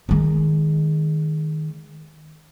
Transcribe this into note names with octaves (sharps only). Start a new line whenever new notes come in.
D#3 G#3